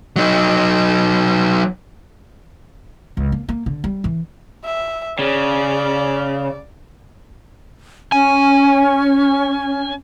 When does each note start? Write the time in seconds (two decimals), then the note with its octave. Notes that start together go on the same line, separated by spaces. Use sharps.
0.16 F#3 D#4
3.17 C#2
3.32 A#3
3.49 A#3
3.66 D3
3.84 G3
4.04 E3
4.65 E5
5.19 C#3 D5
8.12 C#4 G#5